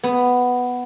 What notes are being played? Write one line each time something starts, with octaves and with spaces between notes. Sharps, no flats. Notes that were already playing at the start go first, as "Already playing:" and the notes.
B3